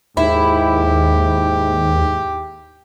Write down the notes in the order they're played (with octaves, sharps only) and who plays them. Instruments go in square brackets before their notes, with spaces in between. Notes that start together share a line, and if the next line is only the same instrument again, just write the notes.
[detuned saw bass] D#2 [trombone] G#2 [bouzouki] E4 [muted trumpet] G4